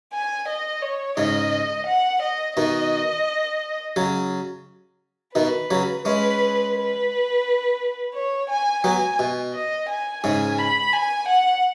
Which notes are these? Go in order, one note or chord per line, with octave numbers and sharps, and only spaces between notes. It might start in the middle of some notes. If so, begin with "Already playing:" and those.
G#5
D#5
C#5
G#2 C#3 D#5
F#5
D#5
B2 D#3 D#5
C#3 F#3
B2 D#3 B4
C#3 F#3
G#3 C#4 B4
B4
C#5
G#5
F#3 B3 G#5
B2
D#5
G#5
G#2 C#3 G#5
B5
G#5
F#5